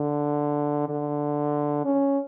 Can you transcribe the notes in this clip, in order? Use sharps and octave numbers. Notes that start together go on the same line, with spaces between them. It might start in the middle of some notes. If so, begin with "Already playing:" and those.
Already playing: D3
D3
C#4